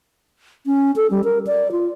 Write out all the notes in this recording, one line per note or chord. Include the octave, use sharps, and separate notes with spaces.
C#4
A4
G3
A#4
D5
F4